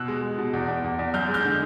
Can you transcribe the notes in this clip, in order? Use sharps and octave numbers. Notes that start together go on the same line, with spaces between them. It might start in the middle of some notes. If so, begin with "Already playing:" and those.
Already playing: B2 E6 F#6
G#3
G#3
B2
E2
E2
E2
E2
F#2 F6 G6
G#3
F6 G6
D3